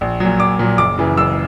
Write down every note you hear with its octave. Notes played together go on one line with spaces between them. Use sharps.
A#1
A#2 F#3
A#1 D6
A#2 F#3
F#1 D6
F#2 C#3 E3
F#1 E6